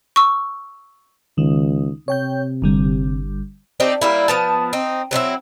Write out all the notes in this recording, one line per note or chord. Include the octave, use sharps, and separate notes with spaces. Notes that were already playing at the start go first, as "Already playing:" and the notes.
C#6 E6
C#2 D#3
C3 C#5 G5 G6
G1 D3 G3
C4 D4 D#4 G4
G3 A#3 E4
F3 B3 A5
C4 D#4
F#3 C4 D#4 E4